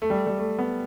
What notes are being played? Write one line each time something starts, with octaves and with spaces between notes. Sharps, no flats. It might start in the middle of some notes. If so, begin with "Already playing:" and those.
A3
G3
G3
A3
B3